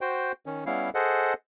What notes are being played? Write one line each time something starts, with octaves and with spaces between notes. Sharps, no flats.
F#4 C5 G5
D#3 C#4
G3 B3 C#4 E4 F5
G#4 A4 C5 D#5 F#5